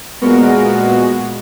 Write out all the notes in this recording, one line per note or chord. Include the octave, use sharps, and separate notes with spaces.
A#2 G#3 B3 F#4 A#4
F#4